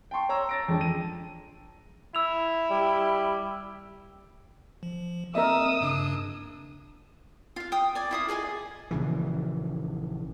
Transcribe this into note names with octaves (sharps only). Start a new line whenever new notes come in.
G5 A5 C6 C#6
C#5 A#5 E6
A6 A#6 D7
F2 G#3 D4
D#7
E4 E6 F7
G3
F3
A#3 C4 A#4 D#5 E5 D#6 E6
G2 C#3 D4
F4 F5
G5 D#6
D5 G#5
E4 F4 D#6
G#4 D5 D#5 G#5
A#1 C#3 E3